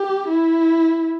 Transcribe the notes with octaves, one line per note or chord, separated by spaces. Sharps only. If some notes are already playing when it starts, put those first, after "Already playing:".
Already playing: G4
E4